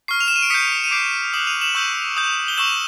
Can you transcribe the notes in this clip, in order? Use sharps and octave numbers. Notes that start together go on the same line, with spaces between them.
C#6 F6 C7
F7
E7
D#7
D7
D#6 G6 B6 C#7
D#7
D6 G6 C7 D7
D#6 F#6 E7 F#7
D#7 F7
E7 F#7
C#6 E6 G6
D#6 G6
G7
C#6 E6 G6 E7 F#7